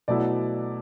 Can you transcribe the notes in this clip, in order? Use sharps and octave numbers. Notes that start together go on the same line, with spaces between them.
B2 F#3 A3 E4 D5